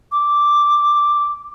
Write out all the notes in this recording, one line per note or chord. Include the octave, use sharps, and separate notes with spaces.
D6